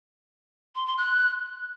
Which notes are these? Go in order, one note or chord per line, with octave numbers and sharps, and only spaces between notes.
C6
C6
F#6